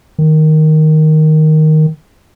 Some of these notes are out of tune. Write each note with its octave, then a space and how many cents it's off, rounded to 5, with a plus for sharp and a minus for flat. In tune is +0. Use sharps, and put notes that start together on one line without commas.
D#3 +0